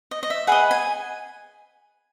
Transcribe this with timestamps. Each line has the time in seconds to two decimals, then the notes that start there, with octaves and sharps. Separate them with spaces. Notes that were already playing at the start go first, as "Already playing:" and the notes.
0.11 D#5
0.23 D#5
0.30 E5
0.47 G#4 B4 D#5 F#5
0.71 G#5